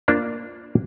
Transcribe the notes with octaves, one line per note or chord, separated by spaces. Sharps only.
A#3 D4 F4 C5 D5